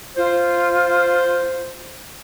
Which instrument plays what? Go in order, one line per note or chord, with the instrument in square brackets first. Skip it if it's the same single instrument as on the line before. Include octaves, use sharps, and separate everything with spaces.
[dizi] F4 [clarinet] C5